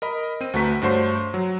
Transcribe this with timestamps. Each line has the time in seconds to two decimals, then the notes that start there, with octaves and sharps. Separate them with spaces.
0.02 A#4 D#5 B5
0.41 C4 D#7
0.53 D2 A3 F#4 B4 A#5 B6
0.82 G2 A3 F#4 C5 C#5 C6
1.34 F#3